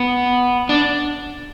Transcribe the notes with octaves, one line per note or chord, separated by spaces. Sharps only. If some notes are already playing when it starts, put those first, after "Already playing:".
Already playing: B3
D4